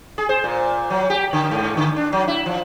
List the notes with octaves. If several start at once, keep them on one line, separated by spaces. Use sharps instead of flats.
G#4
C5
A#2
F#3
G4
D3
G#2
D3
D4
F#3
E4
F3